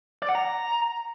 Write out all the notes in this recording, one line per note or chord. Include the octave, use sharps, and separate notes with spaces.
D5
F#5
A#5